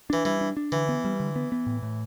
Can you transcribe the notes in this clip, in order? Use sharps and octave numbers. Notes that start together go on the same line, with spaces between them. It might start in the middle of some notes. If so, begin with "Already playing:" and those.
E3 D4
E3 G3
D4
D4
D3 E3
B3
G3
D3
B3
B3
A2
A2